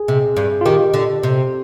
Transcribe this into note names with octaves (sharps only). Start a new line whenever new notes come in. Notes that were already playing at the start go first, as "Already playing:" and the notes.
Already playing: G#4
C3
G2
F4
D#3 G4
D3
C3